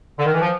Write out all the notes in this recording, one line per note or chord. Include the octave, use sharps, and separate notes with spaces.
D3
D#3
E3
F3